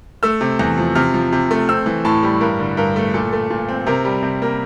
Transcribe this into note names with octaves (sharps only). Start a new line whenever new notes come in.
A3 E6
C3
E2
F3
C3 F6
F3
C3
A3
C4 E6
E3
A2 A5
G3
G2 A#4
D3
G2 A#4
A3
A#2 A4
A3
A#2
C4
C3 A#4
G3
C3
A#3